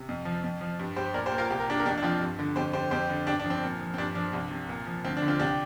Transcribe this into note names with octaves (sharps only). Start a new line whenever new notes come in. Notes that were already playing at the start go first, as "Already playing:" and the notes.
Already playing: C3
F2
F3
F2
F3
G2
G3 G4 C5
A#2 A#4 D5
G4 C5
A#3
F4 A#4
C2 G4
A#4
A#2 D4 G4
A#4
F2 D4 G4
D4
F3 C4 F4
G2
D3
F2 G4 C5
D3 G4 C5
F2 G4 C5
D3
G2 D4 G4
D4
F3
C4
A#2
F3
C4
G2 D4
F3 D4
C2
C3
A#2
F3
D2 C4
D4
D3
C4 F4
C2 D4 G4